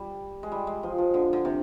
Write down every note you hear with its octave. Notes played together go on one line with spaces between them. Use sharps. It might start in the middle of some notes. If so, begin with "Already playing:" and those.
Already playing: G3
G#3
G3
G#3
F3
F3
D3
D3
C3